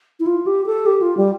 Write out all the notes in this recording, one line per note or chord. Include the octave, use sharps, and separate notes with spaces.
E4
F4
G4
A4
G4
F4
G3